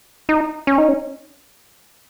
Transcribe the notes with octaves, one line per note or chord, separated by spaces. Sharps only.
D#4
C#4
D#4
C#4